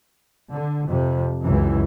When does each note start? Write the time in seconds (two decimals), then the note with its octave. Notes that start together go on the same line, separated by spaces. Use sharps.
0.51 D3
0.87 F2 C3
1.43 C#2 F#2 E3